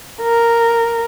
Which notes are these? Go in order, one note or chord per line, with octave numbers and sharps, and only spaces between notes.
A#4